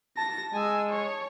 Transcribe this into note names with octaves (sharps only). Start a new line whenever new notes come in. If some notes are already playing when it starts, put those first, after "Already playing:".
A5 A#6
G#3 G#5 E6
C#5